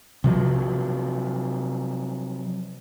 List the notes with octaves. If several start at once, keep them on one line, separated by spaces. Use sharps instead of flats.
C3 F3 F#3